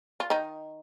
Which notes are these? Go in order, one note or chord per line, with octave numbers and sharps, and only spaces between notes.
F4
D#3 D#4